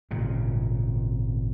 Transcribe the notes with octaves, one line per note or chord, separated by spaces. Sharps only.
G#1 A#2 C#3